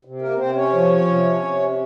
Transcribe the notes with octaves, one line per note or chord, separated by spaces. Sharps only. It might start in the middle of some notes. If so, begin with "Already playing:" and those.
C3
A#3 A#4
C3 C4 C5
C#4 C#5
F3
C3
C3